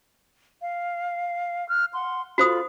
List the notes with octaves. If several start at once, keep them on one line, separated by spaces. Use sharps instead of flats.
F5
F6 F#6
F#5 C6
F4 F#4 A4 C5 B5 D#6